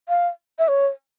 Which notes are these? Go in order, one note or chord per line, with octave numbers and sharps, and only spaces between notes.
F5
E5
C#5